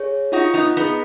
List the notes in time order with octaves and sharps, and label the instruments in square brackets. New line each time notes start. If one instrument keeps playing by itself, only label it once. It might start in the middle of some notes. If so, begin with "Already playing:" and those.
Already playing: [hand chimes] G#4 C#5
[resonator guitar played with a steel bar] D#4 F#4 [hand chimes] F4
[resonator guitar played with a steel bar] B3 D#4
[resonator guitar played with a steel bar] B3 D#4 [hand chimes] G#4 D#5